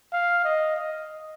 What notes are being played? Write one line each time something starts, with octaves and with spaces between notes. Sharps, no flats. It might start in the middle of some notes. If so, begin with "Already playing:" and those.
F5
D#5
D#5